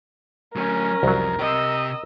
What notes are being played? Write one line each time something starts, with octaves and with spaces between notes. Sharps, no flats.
F#3 A3 C#4 A#4
C2 F2 F#3
C3 G4 D#5 E6